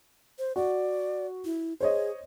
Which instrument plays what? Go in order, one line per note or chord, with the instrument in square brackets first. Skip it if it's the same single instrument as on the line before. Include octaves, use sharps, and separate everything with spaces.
[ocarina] C5
[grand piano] F#4 [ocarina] D5
[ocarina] E4
[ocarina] G#4 [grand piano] C5 C#5 D#5